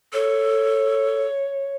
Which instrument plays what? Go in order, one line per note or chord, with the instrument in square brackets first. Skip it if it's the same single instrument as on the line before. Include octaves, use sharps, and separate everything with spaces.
[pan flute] A4 [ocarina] C#5